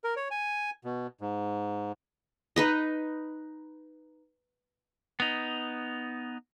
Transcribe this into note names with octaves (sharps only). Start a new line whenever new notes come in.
A#4
C#5
G#5
B2
G#2
D#4 B4 D#5
B3 D#4